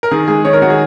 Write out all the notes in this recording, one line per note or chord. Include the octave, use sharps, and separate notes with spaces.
A#4
D#3 G#4
G#3 G#4
D#3 C#5
A#4
D#3 F#4
G#4